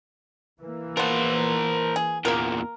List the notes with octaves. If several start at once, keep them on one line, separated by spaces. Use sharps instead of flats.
E3 A#3
F3 B3 A#4 C5
G#4
E2 A#2 A#3 A#4